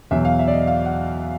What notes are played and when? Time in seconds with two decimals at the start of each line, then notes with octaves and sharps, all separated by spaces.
0.11 E2 B2 F#3 E5
0.25 F5
0.39 E5
0.48 D5
0.53 D#5
0.67 F5
0.86 F#5